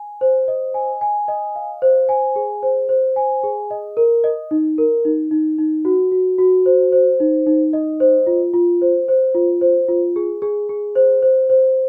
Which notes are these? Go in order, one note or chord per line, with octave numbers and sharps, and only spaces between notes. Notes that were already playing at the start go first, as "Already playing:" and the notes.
Already playing: G#5
C5
D#5
G#5
G#5
D#5
F5
C5
G#5
G#4
C5
C5
G#5
G#4
D#5
A#4
D#5
D#4
A#4
D#4
D#4
D#4
F#4
F#4
F#4
C5
C5
D#4
D#4
D#5
C5
F4
F4
C5
C5
F4
C5
F4
G#4
G#4
G#4
C5
C5
C5